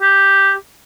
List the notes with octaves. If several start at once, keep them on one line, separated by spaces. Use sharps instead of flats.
G4